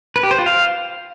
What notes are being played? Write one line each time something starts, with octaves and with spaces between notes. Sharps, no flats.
B4
G4
C5
F4
F5